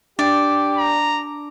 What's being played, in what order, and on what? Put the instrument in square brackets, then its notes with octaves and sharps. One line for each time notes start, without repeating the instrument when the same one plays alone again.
[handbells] D4 D6 D7 [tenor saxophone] G4 [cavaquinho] D5
[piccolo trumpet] A#5